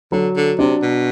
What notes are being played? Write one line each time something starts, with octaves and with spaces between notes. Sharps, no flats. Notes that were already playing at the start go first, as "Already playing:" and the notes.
D3 F#3
D3
C3 D4
B2